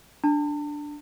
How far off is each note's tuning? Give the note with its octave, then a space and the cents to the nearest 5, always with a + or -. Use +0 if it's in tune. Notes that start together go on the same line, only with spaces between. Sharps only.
D4 +0 A5 +40